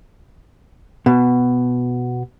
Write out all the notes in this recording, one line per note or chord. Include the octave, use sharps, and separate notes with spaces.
B2